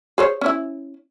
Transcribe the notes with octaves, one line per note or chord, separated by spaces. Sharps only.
G#4 C5 C#5
C#4 E4